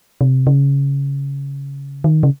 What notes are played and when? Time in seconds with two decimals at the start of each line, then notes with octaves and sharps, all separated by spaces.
0.21 C3
0.47 C#3
2.04 D#3
2.23 C#3